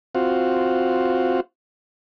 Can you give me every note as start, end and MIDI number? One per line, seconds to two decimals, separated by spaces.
0.15 1.40 60
0.15 1.40 65
0.15 1.40 66